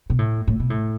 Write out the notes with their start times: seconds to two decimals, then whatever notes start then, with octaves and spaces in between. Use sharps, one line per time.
0.10 B2
0.19 A2
0.47 A2
0.60 B2
0.70 A2